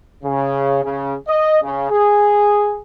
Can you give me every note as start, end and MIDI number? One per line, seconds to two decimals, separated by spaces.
0.24 0.83 49
0.84 1.14 49
1.28 1.57 75
1.62 1.89 49
1.91 2.80 68